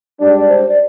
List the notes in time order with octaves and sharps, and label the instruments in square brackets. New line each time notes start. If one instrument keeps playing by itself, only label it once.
[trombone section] G#2 G3 D4 [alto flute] D5
[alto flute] C5
D5